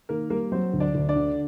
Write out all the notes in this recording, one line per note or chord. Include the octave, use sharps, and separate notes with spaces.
D#3 A#3 A#4
G3 A#3 A#4
F#3 C4 C5
D2
D4 D5
D2
D4 D5
D3